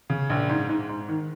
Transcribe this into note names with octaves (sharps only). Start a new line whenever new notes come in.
C#3
A#1
G#2
G#2
G#2
D#3